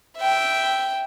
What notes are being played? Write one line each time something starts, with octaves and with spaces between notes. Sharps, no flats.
E5 G5